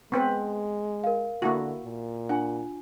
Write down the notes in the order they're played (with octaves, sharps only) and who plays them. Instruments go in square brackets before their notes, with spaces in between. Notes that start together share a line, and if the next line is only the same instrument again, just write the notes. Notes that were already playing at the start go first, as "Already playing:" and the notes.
[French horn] G#3 [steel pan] B3 C4 B4
[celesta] A#4 F5
[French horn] D3 [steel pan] A#3 E4 F#4
[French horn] A#2
[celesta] D4 F4 G#5 [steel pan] F#5